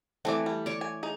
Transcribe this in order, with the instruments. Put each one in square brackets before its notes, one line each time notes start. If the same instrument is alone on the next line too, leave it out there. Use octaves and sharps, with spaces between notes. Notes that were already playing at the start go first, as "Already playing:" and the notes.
[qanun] E3 A3 [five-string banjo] C4 D5
[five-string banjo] G3
[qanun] C#5 D5
[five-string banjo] G#5
D#4 G#4